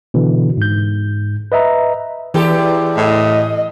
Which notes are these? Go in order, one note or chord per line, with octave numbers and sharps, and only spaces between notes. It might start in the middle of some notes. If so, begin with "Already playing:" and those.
B2 D3 E3
G#2 G6
B4 D#5 E5 A#5
E2 E3 G4 A4
A2 D#5